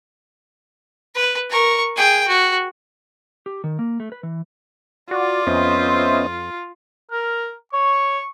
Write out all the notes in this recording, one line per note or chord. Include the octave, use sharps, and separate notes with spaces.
B4
A#4 C#6
G#4 G5
F#4
G4
D#3
A#3
A3
B4
E3
F4 F#4 D5
F2 B3 C#4 C5 D#5 E5
A#4 F6
C#5 C#6